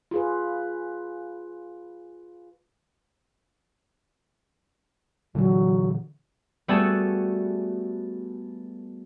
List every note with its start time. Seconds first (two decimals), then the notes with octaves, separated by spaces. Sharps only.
0.11 F4 G#4 B4
5.35 A#2 D3 E3 F#3
6.68 G3 A3 B3 F#4 G#4 A4